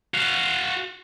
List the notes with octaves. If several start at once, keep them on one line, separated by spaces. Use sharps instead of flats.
F#4 F5